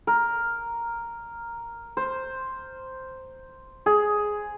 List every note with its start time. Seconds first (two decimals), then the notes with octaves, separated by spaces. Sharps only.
0.07 A#4
1.97 C5
3.86 G#4